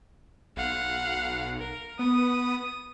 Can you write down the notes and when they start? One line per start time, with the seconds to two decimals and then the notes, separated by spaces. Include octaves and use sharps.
0.57 B1 F5 F#5
1.59 A#4
1.99 B3 D#6